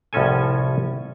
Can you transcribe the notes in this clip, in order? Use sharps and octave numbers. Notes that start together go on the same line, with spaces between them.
C2 A2 F3 C#4 A4 G#5